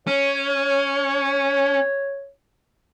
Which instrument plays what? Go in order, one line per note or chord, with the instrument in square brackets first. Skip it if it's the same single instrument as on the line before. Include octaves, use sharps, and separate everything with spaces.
[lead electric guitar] C#4 [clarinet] C#5